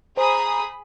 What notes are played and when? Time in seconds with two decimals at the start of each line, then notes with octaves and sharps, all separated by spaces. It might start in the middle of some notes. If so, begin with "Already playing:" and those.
0.17 G#4 C5 A#5 B5 D#6